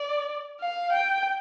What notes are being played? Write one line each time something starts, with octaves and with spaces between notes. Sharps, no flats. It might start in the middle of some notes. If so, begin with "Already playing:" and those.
Already playing: D5
F5
G5